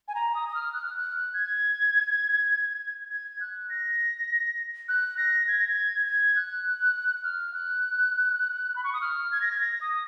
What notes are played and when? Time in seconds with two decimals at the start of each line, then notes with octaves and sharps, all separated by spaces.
0.08 G#5
0.15 A#5
0.35 D#6
0.49 D#6
0.55 F6
0.74 F#6
0.85 F6
0.97 F#6
1.34 G#6
3.10 G#6
3.41 F#6
3.70 A#6
4.88 F#6
5.17 A#6
5.48 G#6
5.58 A#6
5.69 G#6
6.06 G#6
6.36 F#6
7.24 F6
7.54 F#6
8.76 B5
8.84 C#6
8.94 D#6
9.01 F6
9.32 G#6
9.42 A#6
9.51 G#6
9.61 A#6
9.81 D#6